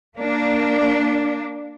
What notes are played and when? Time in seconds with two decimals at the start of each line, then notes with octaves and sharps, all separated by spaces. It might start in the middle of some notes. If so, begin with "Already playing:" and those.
0.19 A#3 D4